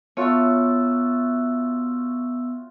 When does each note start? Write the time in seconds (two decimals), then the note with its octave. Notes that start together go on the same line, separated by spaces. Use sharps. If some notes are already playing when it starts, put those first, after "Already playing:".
0.17 A3 B3 F4 F#4 C#5 E6